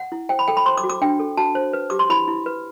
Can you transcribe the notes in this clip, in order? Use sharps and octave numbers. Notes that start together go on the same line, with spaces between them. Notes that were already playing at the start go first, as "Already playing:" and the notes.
Already playing: F#5
E4
C5 G5
B5
A4 G5
B5
C5 C6
D6
F#4
D6
D4 G5
A4
F#4 A5
C5
B4
G4 D6
C6
E4 B5
E4
B4